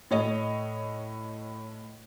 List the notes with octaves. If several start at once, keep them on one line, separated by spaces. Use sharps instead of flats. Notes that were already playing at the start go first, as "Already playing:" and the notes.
A2 C#5 D#5